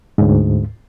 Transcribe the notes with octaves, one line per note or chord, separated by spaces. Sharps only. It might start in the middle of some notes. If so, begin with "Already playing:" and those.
D2 G#2